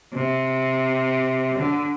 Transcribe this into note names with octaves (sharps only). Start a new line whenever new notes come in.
C3
D3